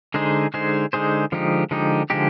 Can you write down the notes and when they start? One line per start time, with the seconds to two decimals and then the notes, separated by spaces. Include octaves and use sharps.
0.14 D3 G#3 D#4 G#4 C5
0.54 D3 G#3 D#4 G#4 C5
0.93 D3 G#3 D#4 G#4 C5
1.32 D3 F3 G#3 D#4 G4
1.71 D3 F3 G#3 D#4 G4
2.10 D3 F3 G#3 D#4 G4